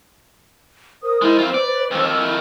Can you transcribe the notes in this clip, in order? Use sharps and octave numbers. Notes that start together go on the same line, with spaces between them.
A#4 C5 D#6
G#3 D#4 E4 A#4
C4 F4
B4 D5
F2 D#3 E6
E4